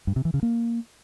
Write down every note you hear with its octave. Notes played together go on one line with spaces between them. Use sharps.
G2
C3
E3
C#3
A#3